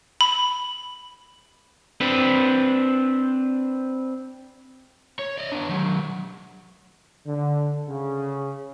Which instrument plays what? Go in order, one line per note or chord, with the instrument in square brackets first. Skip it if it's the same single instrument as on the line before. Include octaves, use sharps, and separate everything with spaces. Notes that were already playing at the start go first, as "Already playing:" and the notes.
[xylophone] B5
[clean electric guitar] C4 D4 B4
[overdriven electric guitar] C#5
D5 D#5
B3 D4
D#3 F#3
[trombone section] D3
C#3